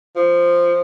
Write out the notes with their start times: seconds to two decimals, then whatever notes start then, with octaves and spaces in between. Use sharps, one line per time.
0.16 F3